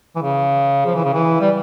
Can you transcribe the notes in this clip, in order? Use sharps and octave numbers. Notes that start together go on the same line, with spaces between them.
E3
C#3
F3
E3
C#3
E3
G3